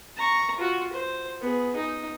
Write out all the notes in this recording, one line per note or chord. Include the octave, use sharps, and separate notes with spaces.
A#5 C#6
F4 F#4
C5
B3 G#4
D#4